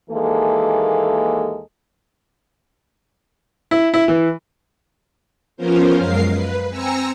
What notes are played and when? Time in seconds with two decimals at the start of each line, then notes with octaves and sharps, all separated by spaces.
0.10 D#2 E3 G#3 A#3 A4
3.71 E4
3.94 E4
4.08 E3
5.57 F3 B3 C#4 F4 A#4 C5
5.98 F#2 G#3 A#4 F5 C7
6.31 B4
6.69 C4 G#5 A#5 E6 A#6 C#7